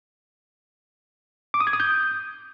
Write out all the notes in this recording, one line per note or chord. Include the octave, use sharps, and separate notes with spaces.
D6
D#6
G#6
D#6
G6